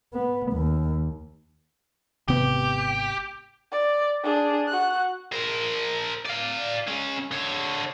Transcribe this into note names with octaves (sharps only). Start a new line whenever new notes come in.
B3
D#2
G#1 C3 B3 G4
D5
D4 G#4
F#4 F#6
A#4 C5
D5 F5
G#3 C#4
D3 C#5